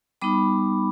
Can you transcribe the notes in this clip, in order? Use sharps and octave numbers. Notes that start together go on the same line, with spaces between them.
G3 B3 D#4 B5 D6